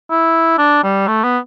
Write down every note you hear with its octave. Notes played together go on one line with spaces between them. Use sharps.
E4
D4
G3
A3
B3